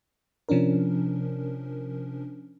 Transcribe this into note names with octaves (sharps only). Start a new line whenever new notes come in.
C3 F3 C#4 D4 A#4